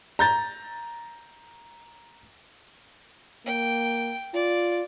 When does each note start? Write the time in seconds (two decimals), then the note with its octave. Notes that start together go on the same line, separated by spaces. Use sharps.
0.19 A#5 G6 A6
3.46 A#3 G5
4.34 F4 D5